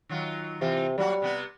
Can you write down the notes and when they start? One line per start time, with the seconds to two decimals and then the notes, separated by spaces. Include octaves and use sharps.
0.09 D#3 F#3 F4
0.61 C3 E3 C4 F4
0.98 F#3 G3 A#3 F#4
1.22 C3 B3 B4